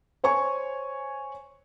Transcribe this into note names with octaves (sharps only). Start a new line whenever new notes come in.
C5 C#5 G#5 C#6